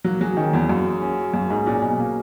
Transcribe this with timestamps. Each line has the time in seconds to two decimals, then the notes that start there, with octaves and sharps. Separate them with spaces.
0.04 F#3 A#3
0.21 F#3 G#4
0.37 D#3 C#4
0.53 E2 F#3
0.69 F#2 A#3
0.86 G#4
1.02 C#4
1.18 F#3
1.34 F#2 A#3
1.50 G#2 G#4
1.66 A#2 C#4
1.82 B2 F#3
1.99 A#3